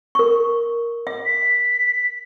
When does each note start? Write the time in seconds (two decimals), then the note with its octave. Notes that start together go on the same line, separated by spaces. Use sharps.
0.15 A#4 C#6
1.07 E5
1.25 B6